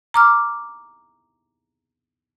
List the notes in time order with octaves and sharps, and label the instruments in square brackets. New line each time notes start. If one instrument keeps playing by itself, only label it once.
[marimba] A#5 D6 F6